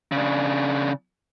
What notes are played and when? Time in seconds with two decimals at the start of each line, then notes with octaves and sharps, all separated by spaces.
0.12 C#3 D4